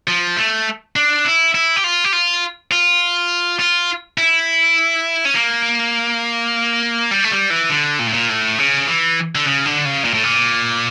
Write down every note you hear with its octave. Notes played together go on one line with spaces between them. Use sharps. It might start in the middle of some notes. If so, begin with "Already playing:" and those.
F3
A3
D4
E4
E4
G4
F4
G4
F4
F4
F4
E4
C#4
A#3
G3
A3
G3
E3
D3
A#2
A2
A#2
A2
C#3
E3
D3
C#3
D3
C#3
A#2
A2
A#2